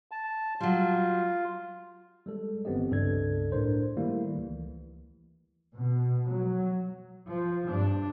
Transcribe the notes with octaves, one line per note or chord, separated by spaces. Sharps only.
A5
F#3 G3 F4
G3 G#3 A4
G1 E3 B3 C4 G4 D#5
C#2 G2 C#3 A4 D5 G#6
A2 D4 A#4 C5
D#3 G3 A3 A#3 E4
C#2 E3
B2
F#3
F3
G2 D4